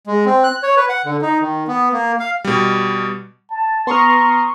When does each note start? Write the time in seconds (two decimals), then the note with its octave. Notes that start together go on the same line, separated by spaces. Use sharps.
0.07 G#3
0.26 C4
0.44 F#6
0.63 C#5
0.77 B4
0.89 F#5
1.05 D3
1.22 D#4
1.41 D#3
1.68 B3
1.93 A#3
2.20 F5
2.44 B2 G3
3.50 A5
3.87 B3 A#5 C6 C#6 D#6 F6